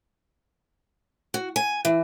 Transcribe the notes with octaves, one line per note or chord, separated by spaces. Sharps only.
F#4
G#5
E3